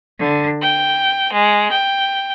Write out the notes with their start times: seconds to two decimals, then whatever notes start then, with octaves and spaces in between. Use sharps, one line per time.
0.19 D3
0.60 G5
1.31 G#3
1.71 G5